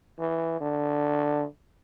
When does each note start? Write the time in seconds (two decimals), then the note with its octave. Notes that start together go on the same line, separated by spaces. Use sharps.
0.19 E3
0.60 D3